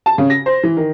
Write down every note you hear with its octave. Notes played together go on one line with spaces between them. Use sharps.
A5
C#3
A#6
C5
E3
D#3